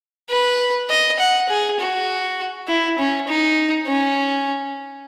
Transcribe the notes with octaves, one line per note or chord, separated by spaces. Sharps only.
B4
D#5
F#5
G#4
F#4
E4
C#4
D#4
C#4